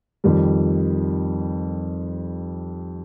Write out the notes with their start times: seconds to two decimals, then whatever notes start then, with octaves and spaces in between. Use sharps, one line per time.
0.24 F2 D#3 G3